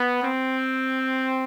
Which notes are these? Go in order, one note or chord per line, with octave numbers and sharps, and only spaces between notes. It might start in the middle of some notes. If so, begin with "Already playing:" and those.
Already playing: B3
C4